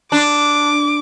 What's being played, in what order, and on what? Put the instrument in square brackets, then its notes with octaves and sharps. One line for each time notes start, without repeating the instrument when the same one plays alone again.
[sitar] D4 [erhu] D6